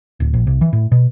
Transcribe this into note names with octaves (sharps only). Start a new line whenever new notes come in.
D1
A#1
C2
E3
A2
B2